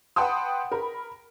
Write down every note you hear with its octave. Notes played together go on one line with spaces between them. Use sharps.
B4 F#5 G5 A5 C6 D#6
A#4 B5